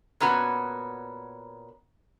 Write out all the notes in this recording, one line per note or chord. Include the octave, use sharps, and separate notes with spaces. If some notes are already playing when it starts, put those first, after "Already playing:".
A#2 B3 C#4 F#4